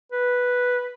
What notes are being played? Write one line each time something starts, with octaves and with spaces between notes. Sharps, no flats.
B4